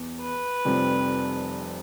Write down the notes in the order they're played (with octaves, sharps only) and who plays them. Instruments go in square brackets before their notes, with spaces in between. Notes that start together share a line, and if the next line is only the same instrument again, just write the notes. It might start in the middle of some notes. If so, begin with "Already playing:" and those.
Already playing: [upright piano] E2 B3
[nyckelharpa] B4
[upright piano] F1 F2 C3 G3